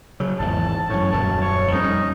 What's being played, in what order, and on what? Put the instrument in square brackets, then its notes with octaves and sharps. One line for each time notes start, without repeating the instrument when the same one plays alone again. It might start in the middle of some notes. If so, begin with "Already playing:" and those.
[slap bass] C#3 F#3
[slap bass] G#1 E2 [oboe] A5
[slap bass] F#2 A2 [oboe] C#5
[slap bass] D#1 F#2 F#3 [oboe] A5
[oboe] C#5
[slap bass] F2 G3 C#4 [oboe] D#4